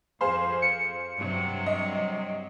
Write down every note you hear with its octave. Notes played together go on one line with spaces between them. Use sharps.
F2 G#4 C5 F5 C6
C#7
G2 C3 F#3
D#5